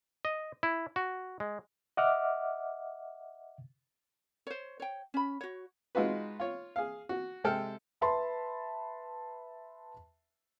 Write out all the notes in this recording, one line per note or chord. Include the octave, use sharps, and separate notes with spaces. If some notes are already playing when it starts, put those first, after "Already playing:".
D#5
E4
F#4
G#3
D#5 E5 F#5 D6 F6
C5 C#5
C#5 G5
C#4 B5
F#4 C#5
G#3 D#4 F4 F#4 B4
F4 C#5
G#4 F5
F#4
C3 G#3 A4 G5 F6
B4 E5 A5 B5 C6